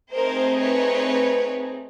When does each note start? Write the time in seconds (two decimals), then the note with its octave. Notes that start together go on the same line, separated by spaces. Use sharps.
0.12 A3 C4 D#4 G#4 A#4 C5
0.61 B4 C#5